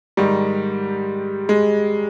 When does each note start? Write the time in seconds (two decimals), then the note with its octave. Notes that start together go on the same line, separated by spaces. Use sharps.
0.17 G#2 D#3 G3
1.49 G#3